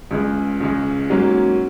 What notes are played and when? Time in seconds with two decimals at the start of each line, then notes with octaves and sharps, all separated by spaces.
0.11 C#2 C#3 G#3
0.61 C#2 C#3 G#3
1.10 G#2 F#3 A#3 C#4